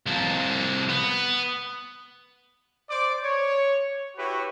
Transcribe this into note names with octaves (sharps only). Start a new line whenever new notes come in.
C2 F3
B3
C5 D5 D6
C#5
E4 F#4 G4 B4 C#5